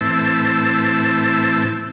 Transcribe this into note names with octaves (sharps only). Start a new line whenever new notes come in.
A2 E3 C4 A5 E6